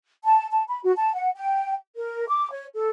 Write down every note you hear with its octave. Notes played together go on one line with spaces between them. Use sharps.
A5
A5
B5
F#4
A5
F#5
G5
A#4
D6
C#5
A4